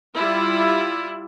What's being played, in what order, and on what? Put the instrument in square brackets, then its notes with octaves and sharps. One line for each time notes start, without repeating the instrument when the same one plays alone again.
[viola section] G3 E4 F4